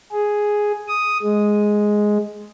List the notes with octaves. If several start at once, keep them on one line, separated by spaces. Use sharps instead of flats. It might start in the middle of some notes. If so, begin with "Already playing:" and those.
G#4
D#6
G#3